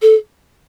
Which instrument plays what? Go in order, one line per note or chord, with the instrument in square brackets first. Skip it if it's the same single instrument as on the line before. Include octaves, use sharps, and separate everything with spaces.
[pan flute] A4